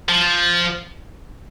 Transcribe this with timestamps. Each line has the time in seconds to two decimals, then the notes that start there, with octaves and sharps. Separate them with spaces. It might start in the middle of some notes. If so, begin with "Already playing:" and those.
0.09 F3